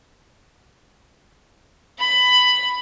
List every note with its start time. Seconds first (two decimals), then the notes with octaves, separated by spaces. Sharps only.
1.99 B5